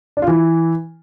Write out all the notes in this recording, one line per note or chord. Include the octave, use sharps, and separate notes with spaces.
D4
F4
E3